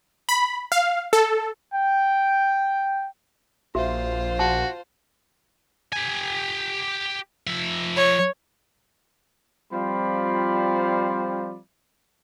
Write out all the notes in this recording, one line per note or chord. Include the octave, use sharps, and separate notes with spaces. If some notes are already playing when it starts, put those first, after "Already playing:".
B5
F5
A4
G5
A#1 F4 F#4 C5 E5
F#4 A5
G4 G#5
F3 E5
C#5
F3 G3 C4 F4 D5 B5